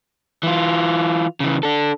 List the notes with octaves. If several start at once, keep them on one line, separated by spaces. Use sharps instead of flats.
E3 F4
C#3 E3
D4 A4